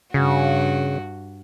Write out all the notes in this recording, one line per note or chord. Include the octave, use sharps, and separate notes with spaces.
G2 C#3 F#4